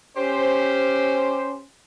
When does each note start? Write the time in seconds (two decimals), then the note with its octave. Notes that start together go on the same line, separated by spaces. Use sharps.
0.16 C#4 G4 C5